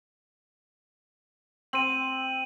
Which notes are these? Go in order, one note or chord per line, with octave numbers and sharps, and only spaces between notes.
C4 D#7 F#7